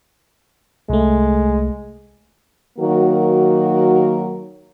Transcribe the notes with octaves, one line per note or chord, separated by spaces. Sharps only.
C2 G#3 A3
D#3 F#3 A#3 F#4 A#4